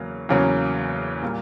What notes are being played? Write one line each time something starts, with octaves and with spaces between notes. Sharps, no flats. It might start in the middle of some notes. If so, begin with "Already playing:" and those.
Already playing: E2 C#3 F#3 A#3
E2 C#3 F#3 A#3 C#4
A#2 G3 A#3